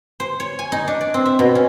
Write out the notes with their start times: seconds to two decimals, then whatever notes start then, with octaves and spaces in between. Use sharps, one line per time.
0.20 C5
0.40 C#5
0.59 G#5
0.72 D#4
0.88 D4
1.01 D5
1.14 C4
1.25 E5
1.39 B2
1.55 C#4